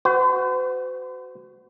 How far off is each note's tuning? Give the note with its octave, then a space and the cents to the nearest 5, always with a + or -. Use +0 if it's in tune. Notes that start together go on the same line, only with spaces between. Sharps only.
F#4 +0 C5 -45